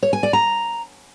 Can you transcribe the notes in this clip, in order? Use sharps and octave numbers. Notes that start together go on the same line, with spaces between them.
C#5
G#5
D5
A#5